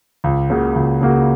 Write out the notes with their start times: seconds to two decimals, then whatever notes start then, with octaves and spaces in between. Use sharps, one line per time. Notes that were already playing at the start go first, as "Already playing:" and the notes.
0.24 C#2
0.50 C#3 A#3 F#4
0.76 C#2
1.01 C#3 A#3 F#4